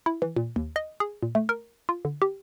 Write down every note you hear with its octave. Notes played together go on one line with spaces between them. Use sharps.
E4
E3
A#2
D#2
D#5
G#4
A#2
A3
A#4
F4
D3
G4